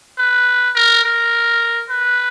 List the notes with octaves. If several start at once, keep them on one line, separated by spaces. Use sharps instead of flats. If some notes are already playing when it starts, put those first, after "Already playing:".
B4
A#4
A#4
B4